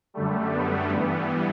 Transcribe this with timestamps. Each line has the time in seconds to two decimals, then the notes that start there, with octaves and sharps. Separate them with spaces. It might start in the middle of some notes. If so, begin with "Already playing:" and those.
0.14 F#2 D3 G3 A3
0.52 B3
0.90 G2 E3 G3